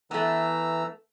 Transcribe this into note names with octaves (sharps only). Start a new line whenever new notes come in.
E3 A3 B3 A#5 E6